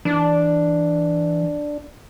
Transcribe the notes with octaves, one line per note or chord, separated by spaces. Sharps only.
E3 D4